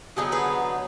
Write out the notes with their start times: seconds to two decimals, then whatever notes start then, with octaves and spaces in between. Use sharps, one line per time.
0.16 D3 F#3 B3 D#4 G#4 B4
0.32 G#4 B4